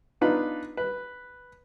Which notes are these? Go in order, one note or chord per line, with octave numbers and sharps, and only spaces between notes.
B3 D4 D#4 F4 B4
B4